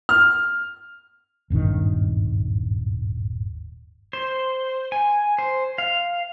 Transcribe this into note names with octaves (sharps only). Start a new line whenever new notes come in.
F6
D#1 G#1 G2 D#3
C5
G#5
C5
F5